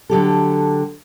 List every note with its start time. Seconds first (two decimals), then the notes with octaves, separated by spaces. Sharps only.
0.10 D3 F#3 G4 A4